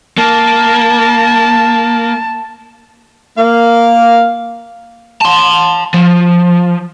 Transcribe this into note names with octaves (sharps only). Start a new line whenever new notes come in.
A#3 A5
A#3 F5
A5 C6
F3